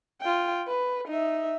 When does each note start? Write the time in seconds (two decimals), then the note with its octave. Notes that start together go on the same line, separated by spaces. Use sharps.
0.21 F4 G5
0.68 B4
1.08 D#4 E5